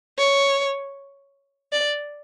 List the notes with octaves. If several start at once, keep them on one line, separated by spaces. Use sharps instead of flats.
C#5
D5